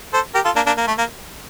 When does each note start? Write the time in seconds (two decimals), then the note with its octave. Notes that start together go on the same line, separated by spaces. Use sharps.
0.13 A4 C5
0.35 G4 A#4
0.45 F4 A4
0.56 A#3 D4
0.66 A#3 D4
0.77 A#3
0.87 A3
0.98 A#3